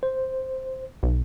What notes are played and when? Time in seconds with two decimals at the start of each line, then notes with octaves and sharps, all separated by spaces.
0.03 C5
1.03 B1